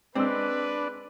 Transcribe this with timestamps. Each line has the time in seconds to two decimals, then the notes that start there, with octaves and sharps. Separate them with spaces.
0.15 G#3 C4 D4 B4 E6